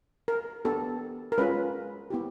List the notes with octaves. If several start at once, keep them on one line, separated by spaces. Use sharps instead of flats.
A#4
B3 D4 G4 A4
A#4
G#3 C#4 F4 B4
B3 E4 G4